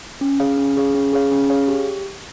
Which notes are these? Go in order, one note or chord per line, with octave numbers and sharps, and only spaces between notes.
C#4
G#4 C#5 F5
C#4
G#4 C#5 F5
C#4
G#4 C#5 F5
C#4
G#4 C#5 F5
G4